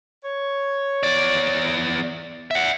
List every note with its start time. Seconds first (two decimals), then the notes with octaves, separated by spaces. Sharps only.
0.25 C#5
1.03 E2 D5
2.51 E5 F#5